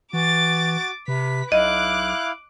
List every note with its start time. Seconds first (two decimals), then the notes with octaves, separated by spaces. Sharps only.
0.13 E3 F#4 D6 A6
1.08 C3 B4 B6
1.52 B1 E4 D#5 F5 D6 F#6